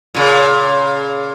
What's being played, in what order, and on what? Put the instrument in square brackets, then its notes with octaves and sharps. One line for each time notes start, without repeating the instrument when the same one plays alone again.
[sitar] A#2 C#3